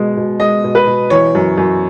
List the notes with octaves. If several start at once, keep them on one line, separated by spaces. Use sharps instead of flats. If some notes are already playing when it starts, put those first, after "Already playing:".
Already playing: B2 G#3
B2
G#3 D#5
B2
B4
B2
E3 C#5
F#2
F#2